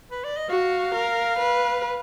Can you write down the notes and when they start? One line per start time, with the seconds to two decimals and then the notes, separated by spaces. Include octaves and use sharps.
0.11 B4
0.24 D5
0.37 D#5
0.49 F#4 F5
0.94 A#4
1.39 B4